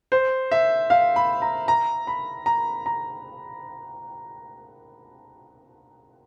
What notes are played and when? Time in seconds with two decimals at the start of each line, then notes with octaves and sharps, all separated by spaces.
0.12 C5
0.51 E5
0.90 F5
1.16 B5
1.42 A#5
1.68 A#5
2.07 B5
2.46 A#5
2.86 A#5